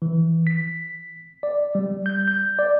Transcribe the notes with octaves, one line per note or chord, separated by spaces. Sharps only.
E3
B6
D5
G3
G6
G6
D5